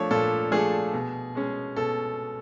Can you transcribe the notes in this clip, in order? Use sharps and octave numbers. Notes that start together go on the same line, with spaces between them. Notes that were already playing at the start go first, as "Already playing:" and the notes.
Already playing: F3 A3 D4 C#5
A#2 A4
F3 A3 D4 G#4
B2
G#3 C#4
B2 A4